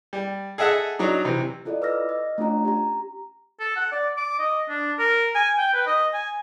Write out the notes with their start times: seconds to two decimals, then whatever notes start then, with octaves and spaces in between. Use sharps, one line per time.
0.13 G3
0.58 G#4 A4 D#5 E5 F#5 A5
0.99 F#3 D4 D#4
1.25 C3 E3
1.65 E4 F4 A4 D5 D#5
1.82 B4 D#5 D6 E6 F6 A#6
2.09 D#5
2.38 A3 C#4 D4 F4 A#5
2.65 G4 A#5
3.60 A4
3.76 F#5
3.92 D5
4.17 D6
4.39 D#5
4.69 D4
4.99 A#4
5.35 G#5
5.58 G5
5.74 B4
5.86 D#5
6.14 G#5